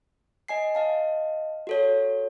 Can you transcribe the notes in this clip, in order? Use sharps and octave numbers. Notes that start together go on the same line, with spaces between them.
D#5 G#5 C7
D#5 F5 A5
F#4 A4 C#5